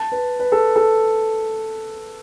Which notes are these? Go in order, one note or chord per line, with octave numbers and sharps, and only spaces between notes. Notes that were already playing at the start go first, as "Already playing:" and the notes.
Already playing: A5
B4
B4
A4
A4